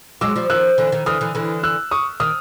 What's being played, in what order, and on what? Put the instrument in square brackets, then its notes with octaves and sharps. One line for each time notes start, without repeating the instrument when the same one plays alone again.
[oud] F#3 G#3 [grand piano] D6 E6
[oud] F3 G3
[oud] D#3 F3 [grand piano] E6 F#6
[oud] D3 E3
D#3
[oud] D3 E3 [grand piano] D#6 F6
[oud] D3 E3
D3 E3
[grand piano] E6 F#6
C#6 D#6
[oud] D#3 [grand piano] D#6 F6